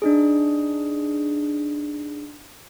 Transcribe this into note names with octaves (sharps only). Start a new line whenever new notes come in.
D4 D#4 G#4